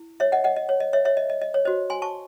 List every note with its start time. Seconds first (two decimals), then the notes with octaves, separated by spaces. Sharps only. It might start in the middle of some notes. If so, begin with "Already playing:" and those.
Already playing: E4
0.20 C#5 E5
0.32 D#5 F#5
0.44 D#5 F#5
0.56 D#5
0.69 C#5
0.80 D#5
0.93 C#5 E5
1.05 C#5 E5
1.17 D#5
1.30 D#5
1.42 D#5
1.54 C#5
1.65 F#4 C5 D#5
1.90 G#5 C6
2.02 A5 C#6